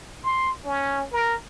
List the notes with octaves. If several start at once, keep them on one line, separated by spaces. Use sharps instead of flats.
C6
C#4
A#4